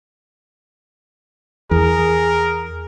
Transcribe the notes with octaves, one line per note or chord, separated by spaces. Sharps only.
E2 G#4 A#4